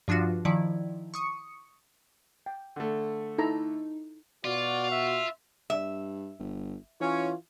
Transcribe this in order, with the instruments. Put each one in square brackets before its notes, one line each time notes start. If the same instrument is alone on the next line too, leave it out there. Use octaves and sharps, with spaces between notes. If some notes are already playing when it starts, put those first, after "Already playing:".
[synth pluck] G2 F3 D4 F4 F#4
D#3 F3 E4 D5
C#6 D#6 C#7
[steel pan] G5
[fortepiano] D3 A3
[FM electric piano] D#4 [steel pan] E4 A4 A#5
[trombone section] B2 F#4 [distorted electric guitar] F4 [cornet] D5
[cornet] E5
[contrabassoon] G2 [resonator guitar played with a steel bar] E5
[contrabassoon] G1
[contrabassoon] E3 [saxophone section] C#4 C#5 [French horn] F4